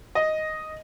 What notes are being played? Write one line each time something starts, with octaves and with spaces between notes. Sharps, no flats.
D#5